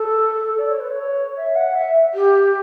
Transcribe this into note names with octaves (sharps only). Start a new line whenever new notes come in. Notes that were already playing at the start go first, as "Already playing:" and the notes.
Already playing: A4
D5
C#5
B4
C#5
E5
F#5
E5
G4